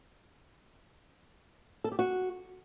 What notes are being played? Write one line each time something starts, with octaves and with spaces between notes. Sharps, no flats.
A4
G4
F#4